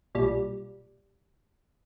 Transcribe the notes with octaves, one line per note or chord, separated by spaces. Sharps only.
B1 A#2 G3